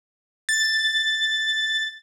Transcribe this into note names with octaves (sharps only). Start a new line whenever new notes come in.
A6